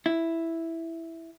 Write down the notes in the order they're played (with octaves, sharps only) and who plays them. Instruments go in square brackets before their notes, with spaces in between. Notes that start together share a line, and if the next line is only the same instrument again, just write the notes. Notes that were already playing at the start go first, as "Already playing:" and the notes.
[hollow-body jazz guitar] E4